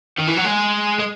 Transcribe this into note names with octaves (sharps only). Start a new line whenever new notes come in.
D#3
E3
F#3
G#3
G#3